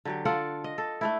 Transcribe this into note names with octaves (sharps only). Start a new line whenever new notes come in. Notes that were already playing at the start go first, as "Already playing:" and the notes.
D3 F#3 G4
F4 A4 D5 F#5
D#5
A4
A3 D4 E4